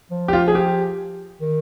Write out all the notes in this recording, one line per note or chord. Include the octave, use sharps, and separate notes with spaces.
F3
G4
F4
G#4
G4
D#3